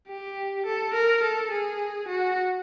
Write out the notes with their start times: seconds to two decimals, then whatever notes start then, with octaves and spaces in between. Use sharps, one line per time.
0.08 G4
0.66 A4
0.94 A#4
1.23 A4
1.51 G#4
2.09 F#4